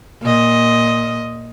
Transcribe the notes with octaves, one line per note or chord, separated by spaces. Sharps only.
A#2 D#5